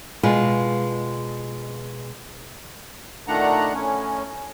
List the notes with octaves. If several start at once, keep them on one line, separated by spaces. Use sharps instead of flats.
B2 G#3 F4 B4
A#2 D#3 A3 D4 F#5 A#5
A2 C#4